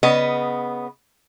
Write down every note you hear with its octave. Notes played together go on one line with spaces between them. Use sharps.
C#3 B3 D#5